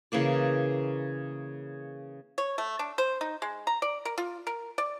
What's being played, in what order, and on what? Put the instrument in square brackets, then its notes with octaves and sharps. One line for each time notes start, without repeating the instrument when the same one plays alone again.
[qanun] C#3 E3 A#3 D5
[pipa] C#5
A3
D4
C5
D#4
G#3
A#5
D5
A#4
F4
A#4
D5